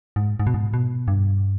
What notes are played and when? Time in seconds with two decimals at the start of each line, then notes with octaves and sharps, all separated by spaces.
0.16 G#2
0.40 G#2
0.47 B2
0.54 G#2
0.74 B2
1.08 G2